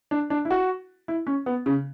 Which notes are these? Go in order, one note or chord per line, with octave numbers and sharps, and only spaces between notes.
D4
D4
E4
F#4
E4
C#4
B3
C#3